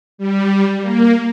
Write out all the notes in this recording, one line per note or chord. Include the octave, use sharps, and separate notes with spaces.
G3
A#3